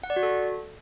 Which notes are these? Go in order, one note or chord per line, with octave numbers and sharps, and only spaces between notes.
F#5
D5
F#4
A4